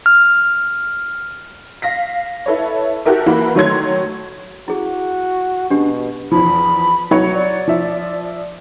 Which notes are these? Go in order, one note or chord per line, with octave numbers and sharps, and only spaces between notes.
F6
F5 A#6 B6
E4 A4 B4 C#5
E4 F#4 G4 A4 A#4 E5
E3 A#3 F#4 B5
D#3 F#3 A3 C#5 C6 G#6
E4 F#4 G#4
B2 D4 G4 F#5
E2 F3 B5
F#3 C#5
D5
F3 E5